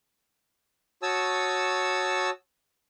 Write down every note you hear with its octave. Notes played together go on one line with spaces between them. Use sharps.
F#4 C#5 A5 D#6 E6